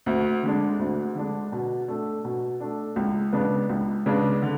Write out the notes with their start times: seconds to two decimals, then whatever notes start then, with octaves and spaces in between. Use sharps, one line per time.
0.06 D2
0.43 D3 G#3 D4
0.79 D2
1.15 D3 G#3 D4
1.52 B2
1.88 A3 D4
2.25 B2
2.60 A3 D4
2.96 C#2
3.33 C#3 G#3 B3 D4
3.70 C#2
4.06 C#3 G#3 B3 D4
4.42 D3